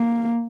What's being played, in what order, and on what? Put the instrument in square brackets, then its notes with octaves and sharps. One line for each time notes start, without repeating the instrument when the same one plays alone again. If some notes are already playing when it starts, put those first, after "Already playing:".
Already playing: [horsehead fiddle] A#3